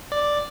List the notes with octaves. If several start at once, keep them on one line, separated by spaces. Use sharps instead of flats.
D5